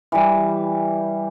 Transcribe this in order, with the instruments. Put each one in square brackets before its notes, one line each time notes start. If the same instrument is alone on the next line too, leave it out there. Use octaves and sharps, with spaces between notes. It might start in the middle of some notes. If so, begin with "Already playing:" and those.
[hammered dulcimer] E3 G3